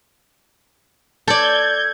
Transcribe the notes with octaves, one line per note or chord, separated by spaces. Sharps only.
A4 D5 G6 G#6